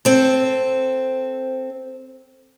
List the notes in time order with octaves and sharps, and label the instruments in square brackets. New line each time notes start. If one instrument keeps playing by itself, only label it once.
[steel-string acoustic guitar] C4 A4